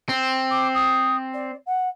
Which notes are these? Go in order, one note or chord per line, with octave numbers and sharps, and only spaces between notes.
C4
D6
D#6
D5
F#5